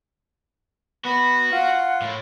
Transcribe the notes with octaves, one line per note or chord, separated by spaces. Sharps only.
B3 F#4 B5
F4 F#5
A2